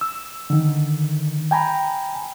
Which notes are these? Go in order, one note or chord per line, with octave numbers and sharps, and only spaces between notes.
E6
D3 D#3
G5 G#5 A#5 B5